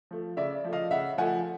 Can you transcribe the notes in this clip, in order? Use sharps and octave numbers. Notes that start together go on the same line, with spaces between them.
F3 A3
C#3 D5 E5
F3 A3
D#5 F5
C#3 E5 F#5
F3 A3 F#5 G#5